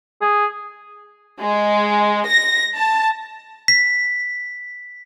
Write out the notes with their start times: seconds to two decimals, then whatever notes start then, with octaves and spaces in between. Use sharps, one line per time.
0.21 G#4
1.40 G#3
2.27 A#6
2.74 A5
3.68 B6